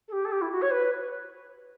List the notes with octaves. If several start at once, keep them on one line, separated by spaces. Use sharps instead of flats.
A4
G4
A4
G4
E4
F#4
C#5
B4